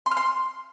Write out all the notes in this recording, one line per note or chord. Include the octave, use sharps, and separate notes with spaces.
C6
F6
C6